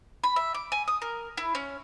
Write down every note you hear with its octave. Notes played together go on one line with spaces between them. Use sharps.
B5
E5
D6
G#5
D#6
A#4
E4
C#4